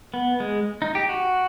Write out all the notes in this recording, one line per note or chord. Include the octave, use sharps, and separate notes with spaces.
B3
G#3
D#4
G4
F#4